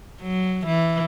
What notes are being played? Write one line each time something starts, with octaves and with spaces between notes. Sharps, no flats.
F#3
E3